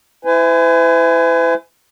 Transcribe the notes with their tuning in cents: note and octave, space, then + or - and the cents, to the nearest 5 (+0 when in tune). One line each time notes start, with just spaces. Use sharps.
E4 +0 B4 +45 G#5 +0